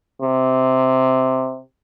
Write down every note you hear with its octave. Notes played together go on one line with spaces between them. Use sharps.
C3